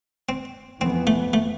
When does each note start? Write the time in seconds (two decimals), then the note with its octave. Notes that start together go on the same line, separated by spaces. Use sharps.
0.29 C4
0.81 F2 E3 B3 C4
1.07 A3
1.33 A3